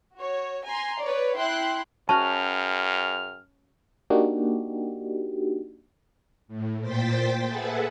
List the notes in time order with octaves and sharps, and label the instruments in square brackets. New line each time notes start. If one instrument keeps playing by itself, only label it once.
[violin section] F#4 C#5
G#5 A#5 C6
B4 C#5 D5
E4 G5 C6 F#6
[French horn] F#2 [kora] C#4 F#4 [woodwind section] G#4 G5 F6 [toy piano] A5
[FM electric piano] A#3 D4 D#4 F#4 G4
[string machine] A2
A#2 C5 G5 A6 B6
G#4 A4 B4 E5 F#5 G#5